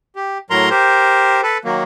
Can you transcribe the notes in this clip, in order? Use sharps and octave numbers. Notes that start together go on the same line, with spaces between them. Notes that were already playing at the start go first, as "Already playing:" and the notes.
G4
A2 F#3 A#4 A#5 C6
G4 A#4 C5
A4 B4
D#3 F#3 A#3